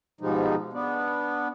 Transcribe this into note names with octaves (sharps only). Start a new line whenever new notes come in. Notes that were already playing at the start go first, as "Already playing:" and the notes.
G#2 B2 F3 G3 G#3 D#4
B3 D4